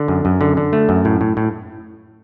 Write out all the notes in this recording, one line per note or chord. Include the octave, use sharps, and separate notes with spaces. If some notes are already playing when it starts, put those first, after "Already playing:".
Already playing: D3
F#2
F#2
D3
D3
A3
F#2
A2
A2
A2